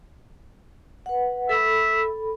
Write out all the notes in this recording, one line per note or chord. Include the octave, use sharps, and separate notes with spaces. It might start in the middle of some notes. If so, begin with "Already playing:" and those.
B4 F#5
A4 E5 B5